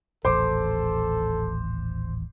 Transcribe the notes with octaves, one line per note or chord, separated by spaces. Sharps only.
D#1 A1 A4 C5 C6 D6